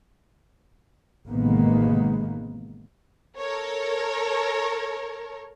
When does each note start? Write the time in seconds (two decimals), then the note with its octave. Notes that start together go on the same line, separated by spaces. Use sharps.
1.28 A1 C3 D#3 G#3 A#3 B3
3.38 A4 A#4 C#5